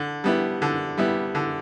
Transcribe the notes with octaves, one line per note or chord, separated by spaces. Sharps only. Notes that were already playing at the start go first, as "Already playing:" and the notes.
Already playing: D3
G3 B3 E4
D3
G3 B3 E4
D3